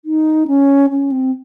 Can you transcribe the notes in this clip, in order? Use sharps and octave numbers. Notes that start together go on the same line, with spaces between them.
D#4
C#4
C#4
C4